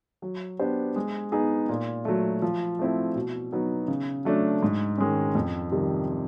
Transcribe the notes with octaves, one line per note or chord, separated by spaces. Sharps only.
F#3
B3 D4 G4 C5
G#3
B3 D#4 G#4
A#2
F#3 A3
F3
A3 C4 E4
B2
F#3 B3 D#4
C#3
F#3 A3 D4
G#2
D#3 G#3 C#4
F2
C3 D#3 G3